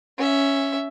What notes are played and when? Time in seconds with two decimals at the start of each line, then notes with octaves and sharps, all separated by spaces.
0.18 C#4 E5